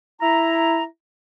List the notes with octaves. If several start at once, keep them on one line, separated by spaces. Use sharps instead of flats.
E4 A#5